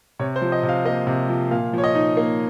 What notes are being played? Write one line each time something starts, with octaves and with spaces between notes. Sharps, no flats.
C3 C#5
C5
F3
D#5
C3
F5
A#3 D#5
C3
F3
A#2 F5
F3 C#5
D#5
D#4
A#3